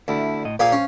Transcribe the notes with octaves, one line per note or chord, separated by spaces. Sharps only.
D2 D4 E4
A2 D#5
A#2 A#3 G#4 C5 F5
C#4